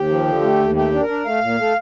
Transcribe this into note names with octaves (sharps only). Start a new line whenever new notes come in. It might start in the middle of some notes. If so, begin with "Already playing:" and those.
Already playing: D#2 G4
F3
D3
A3
D#2
A3 G4
D4
A#4
D4
A3 F5
A#2
A3